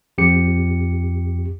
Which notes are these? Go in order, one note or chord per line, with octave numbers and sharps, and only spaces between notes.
F2 G4 C#7